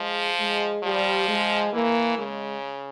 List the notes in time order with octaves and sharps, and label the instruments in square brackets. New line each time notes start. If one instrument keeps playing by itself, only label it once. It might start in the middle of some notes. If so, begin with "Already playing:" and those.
Already playing: [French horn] F3 [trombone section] G#3
[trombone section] G#3
[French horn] F3 [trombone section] G3
[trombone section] G#3
[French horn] E3 [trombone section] A#3
[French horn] C#3 [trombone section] G#3